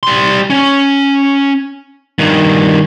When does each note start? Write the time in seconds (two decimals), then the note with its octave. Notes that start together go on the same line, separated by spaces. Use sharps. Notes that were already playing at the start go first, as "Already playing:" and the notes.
0.03 G3 C6
0.50 C#4
2.18 G2 D#3